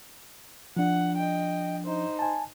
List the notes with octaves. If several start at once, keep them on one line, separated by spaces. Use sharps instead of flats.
F3 D4 F#5
D#5 G5
D#4 C5
G#5 A5